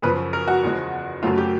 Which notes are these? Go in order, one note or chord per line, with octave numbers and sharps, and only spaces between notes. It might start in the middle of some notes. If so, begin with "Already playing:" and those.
F#2 C#3 F3 B4
A#4
F#4
E2 C#3 F3 G#3
F#2 C#3 F#3 A3 F4
G4